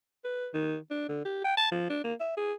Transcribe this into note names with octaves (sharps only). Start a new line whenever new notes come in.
B4
D#3
D4
D3
G4
G5
A5
F3
D4
A#3
E5
G#4